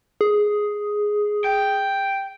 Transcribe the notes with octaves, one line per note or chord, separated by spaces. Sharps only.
G#4
G5